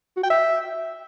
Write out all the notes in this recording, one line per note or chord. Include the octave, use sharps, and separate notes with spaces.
F#4
G5
E5